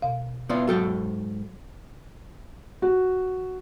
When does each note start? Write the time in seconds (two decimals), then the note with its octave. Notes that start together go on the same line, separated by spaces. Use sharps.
0.02 B2 F5
0.49 B3 E4 F4 D5
0.68 G#2 F#3 F#4 A4 G5
2.82 F#4